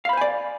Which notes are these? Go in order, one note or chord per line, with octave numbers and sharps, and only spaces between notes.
C5 D5 F5 G#5 B5